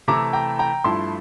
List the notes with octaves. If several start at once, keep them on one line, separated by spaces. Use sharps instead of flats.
C3 E3 A3 E4 A#5 D6
G5 A#5
G5 A#5
G2 F3 A3 E4 A5 C6